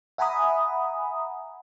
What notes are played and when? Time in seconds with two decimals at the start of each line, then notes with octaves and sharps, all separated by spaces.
0.18 E5 F#5 G#5 A#5 B5 D#6